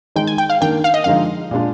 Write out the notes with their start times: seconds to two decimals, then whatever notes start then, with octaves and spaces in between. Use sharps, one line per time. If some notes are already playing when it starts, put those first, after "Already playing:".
0.16 D#3 G#3 D#4 G5
0.27 G#5
0.38 G5
0.50 F5
0.61 D#3 A#3 D4 G5
0.84 F5
0.94 D#5
1.04 D3 F3 G#3 D#4 F5
1.51 A#2 G#3 D4